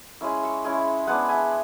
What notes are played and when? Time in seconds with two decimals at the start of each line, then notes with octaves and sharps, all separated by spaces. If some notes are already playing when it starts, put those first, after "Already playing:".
0.21 G#3 C#4 E4 E6
0.43 C#6 E6
0.64 G#3 C#4 E4
1.07 G#3 B3 D4 F#5 A5
1.29 E5 G#5